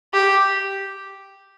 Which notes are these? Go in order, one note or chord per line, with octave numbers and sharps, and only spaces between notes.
G4